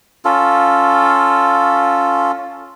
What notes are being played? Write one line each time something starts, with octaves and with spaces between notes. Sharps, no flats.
C#4 F4 A4